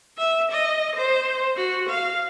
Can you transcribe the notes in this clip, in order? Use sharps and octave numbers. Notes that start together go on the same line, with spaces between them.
E5
D#5
C5
F#4
F5